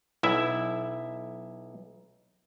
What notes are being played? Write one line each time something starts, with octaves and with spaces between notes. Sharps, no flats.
B1 E4 E5